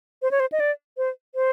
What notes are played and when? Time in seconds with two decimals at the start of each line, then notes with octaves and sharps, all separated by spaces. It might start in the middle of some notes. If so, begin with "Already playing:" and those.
0.22 C5
0.31 C#5
0.40 C5
0.52 D#5
0.60 D5
0.97 C5
1.35 C5